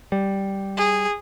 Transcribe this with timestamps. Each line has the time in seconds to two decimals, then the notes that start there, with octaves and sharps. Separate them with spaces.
0.12 G3
0.77 G#4